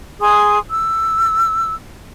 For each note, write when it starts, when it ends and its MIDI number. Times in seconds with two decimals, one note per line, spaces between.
0.21 0.58 68
0.21 0.58 80
0.21 0.58 84
0.21 0.58 87
0.70 1.74 88